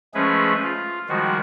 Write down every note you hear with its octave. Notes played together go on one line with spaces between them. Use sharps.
F3 G#3 A3 C#4 G#4 B4
F4
D#3 F3 G3 G#3 F#4